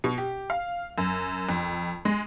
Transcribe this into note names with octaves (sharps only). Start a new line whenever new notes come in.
B2
G4
F5
F#2
F2
G#3